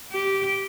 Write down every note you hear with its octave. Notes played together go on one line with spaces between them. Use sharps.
G4